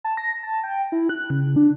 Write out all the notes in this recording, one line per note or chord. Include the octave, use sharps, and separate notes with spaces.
A5
A#6
A5
G5
E4
F#6
C#3
D4